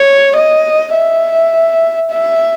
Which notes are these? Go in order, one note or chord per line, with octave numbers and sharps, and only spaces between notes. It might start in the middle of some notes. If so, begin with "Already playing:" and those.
Already playing: C#5
D#5
E5
E5